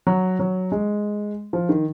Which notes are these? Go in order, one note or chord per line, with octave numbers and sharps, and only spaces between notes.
F#3
F#3
G#3
F3
D#3